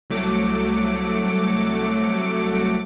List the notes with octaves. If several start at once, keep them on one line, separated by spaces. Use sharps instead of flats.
C2 F#3 A3 D6 C#7 D7